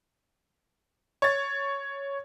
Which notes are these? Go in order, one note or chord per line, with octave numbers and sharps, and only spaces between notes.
C#5 A6